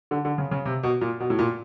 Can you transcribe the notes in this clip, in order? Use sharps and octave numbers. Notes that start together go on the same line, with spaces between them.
D3
D3
C#3
C#3
C3
B2
A#2
B2
A2
A#2